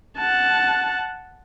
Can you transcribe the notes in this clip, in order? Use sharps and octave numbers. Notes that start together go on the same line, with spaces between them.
F#5 A5